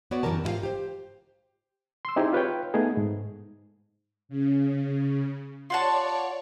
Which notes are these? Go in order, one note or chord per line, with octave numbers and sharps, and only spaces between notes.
B3 F#4 C#5 D5
F#2 C3 E3 G3 A#4 A5
G#2 E4 F4 G4 F5
G4 C5
C6 E6
C4 D#4 E4 G4 G#4
F4 B4 C#5 G5
A3 B3 D#4 G#4
G#2
C#3
F4 C#5 D5 F#5 A5 C#6